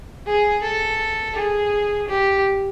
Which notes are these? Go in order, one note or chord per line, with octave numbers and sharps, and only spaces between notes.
G#4
A4
G#4
G4